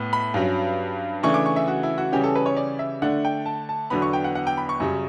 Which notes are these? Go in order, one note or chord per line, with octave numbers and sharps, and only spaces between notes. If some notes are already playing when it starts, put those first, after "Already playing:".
Already playing: A2 B3
B5
G2 F#3 C#4
C#3 E3 A3 D4 C#6
D6
C#6
E5
F#4
E4
F#4
C#3 E3 G3 C#4 G4
A4
B4
C#5
D5
E5
D3 A3 D4 F#5
G5
A5
A5
E2 D3 F#3 B3 B5
C#6
G5
F#5
F#5
G5
B5
C#6
F#2 C#3 G3